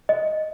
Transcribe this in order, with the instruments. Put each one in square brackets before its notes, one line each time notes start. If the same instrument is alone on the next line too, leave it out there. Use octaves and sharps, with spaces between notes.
[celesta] D#5